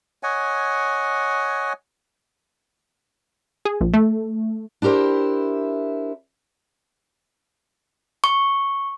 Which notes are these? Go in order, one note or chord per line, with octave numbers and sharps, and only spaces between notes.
C#5 D#5 F#5 G#5
G#4
A#1
A3
D4 E4 G4 A#4 C5
C#6